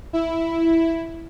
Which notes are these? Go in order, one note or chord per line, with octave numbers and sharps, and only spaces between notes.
E4